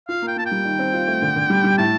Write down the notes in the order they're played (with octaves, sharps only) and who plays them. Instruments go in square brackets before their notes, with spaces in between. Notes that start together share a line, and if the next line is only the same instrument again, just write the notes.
[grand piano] F4 [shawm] F5
[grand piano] A#3
[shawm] G5
[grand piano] A#3 [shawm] A5
[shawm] G5
[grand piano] G3
D#3
C4
F4
A3
D3
D3
G3
G3
[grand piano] A2 [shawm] A5